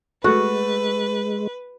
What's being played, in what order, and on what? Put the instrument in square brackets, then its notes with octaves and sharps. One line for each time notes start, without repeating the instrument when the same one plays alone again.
[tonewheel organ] G#3 [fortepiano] A3 [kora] F#4 [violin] B4